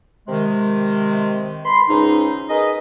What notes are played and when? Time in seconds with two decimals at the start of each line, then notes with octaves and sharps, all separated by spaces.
0.28 C3 D#3 G#3
1.65 B5 C6
1.89 C#2 G#2 C#4 D#4
2.50 G#4 A#4 B4 D#5